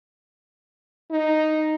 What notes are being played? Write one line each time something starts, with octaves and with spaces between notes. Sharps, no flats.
D#4